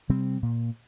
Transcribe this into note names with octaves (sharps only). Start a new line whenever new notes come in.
C3 G3 C4
A#2